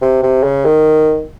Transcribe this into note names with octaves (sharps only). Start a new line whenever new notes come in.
C3
C3
C#3
D#3